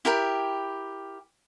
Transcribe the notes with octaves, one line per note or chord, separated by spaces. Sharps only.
E4 G4 A#4 G5